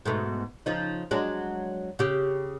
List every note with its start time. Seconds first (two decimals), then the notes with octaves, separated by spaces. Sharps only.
0.06 G#2 B2 A3
0.66 C#3 F3 D#4
1.11 F#3 G#3 D4
1.99 C#3 G4